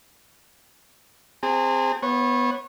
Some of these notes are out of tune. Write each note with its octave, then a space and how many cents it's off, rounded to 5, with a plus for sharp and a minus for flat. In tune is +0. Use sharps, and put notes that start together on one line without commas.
C4 +0 G#4 -25 A5 +45
B3 +0 C#5 -30